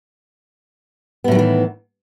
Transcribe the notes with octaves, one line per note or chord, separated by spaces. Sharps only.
A2 D#3 E3 F#3 B3